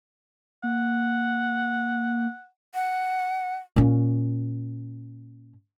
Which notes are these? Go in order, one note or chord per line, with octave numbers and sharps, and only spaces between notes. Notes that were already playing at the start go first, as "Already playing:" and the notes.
A#3 F#5
F#5
A#2 C#4